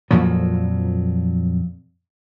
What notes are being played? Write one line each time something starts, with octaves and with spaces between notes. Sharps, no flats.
F2 A#2 F3 F#3